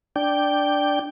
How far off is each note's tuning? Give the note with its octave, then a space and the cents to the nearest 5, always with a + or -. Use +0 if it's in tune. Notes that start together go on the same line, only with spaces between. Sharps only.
D4 +0 G5 +0